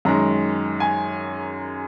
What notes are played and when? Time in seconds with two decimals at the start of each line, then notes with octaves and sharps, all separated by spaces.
0.05 F#2 D#3 G#3 A#5
0.80 G#5